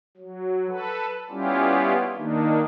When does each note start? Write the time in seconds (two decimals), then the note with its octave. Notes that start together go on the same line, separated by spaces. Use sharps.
0.17 F#3
0.68 A4 B4
1.30 G3 B3 C#4 E4 F4 G4
2.16 D#3 A#3 D4 D#4